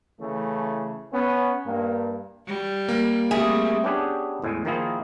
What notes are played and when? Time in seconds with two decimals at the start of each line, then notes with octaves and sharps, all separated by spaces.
0.20 C#3 E3 A3
1.13 B3 C#4
1.65 G2 A#3
2.47 G3
2.89 A#3
3.31 G3 A3 C4 G#4 E5
3.84 B3 C#4 D4 G4 G#4
4.42 E2 A2 G#3 G#5
4.65 D#3 F3 A#3 E4 F4 G#4